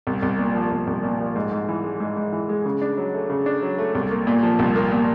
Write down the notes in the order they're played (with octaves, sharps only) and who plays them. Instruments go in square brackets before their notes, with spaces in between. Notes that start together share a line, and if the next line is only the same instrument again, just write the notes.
[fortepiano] C2
C2
A#2
F3
C2
C2
A#2
F3
G#2
G#2
E3
G#3
G#2
G#2
E3
G#3
C#3
D4
F#3
A3
C#3
D4
F#3
A3
C2
A#3
A#2
F3
C2
A#3
A#2